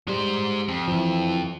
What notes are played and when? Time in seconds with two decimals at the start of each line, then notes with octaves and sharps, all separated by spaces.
0.08 G3 G#3 C5
0.68 F2
0.88 E3 F3